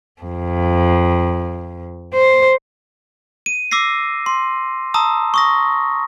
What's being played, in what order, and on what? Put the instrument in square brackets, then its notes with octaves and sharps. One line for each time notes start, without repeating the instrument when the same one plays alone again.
[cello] F2
C5
[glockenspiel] D#7
D6 E6 A#6 C7
C6
A5 A#5 D#6 E6
C#6 D#6 A#6